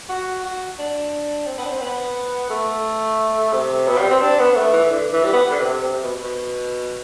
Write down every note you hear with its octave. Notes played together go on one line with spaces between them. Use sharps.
F#4
F#4
D4
C4
B3
D4
C4
B3
A3
C3
B2
G3
C4
D4
B3
A3
E3
D3
E3
G3
B3
D3
C3
C3
B2
B2